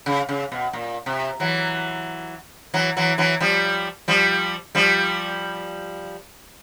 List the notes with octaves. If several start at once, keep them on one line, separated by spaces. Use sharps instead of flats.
C#3
C#3
B2
A#2
C3
E3 F#3
E3 F#3
E3 F#3
E3 F#3
F3 G3
F3 G3
F3 G3